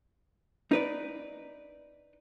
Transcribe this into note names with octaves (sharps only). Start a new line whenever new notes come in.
D#4 B4 D5